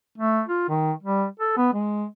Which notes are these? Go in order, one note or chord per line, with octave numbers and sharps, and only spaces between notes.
A3
F4
D#3
G3
A4
B3
G#3